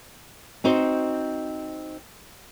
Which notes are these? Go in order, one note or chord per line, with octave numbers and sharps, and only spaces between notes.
C4 D#4 F#4 C5